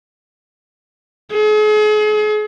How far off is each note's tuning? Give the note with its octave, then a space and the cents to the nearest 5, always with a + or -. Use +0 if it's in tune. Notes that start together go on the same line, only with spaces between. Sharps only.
G#4 +40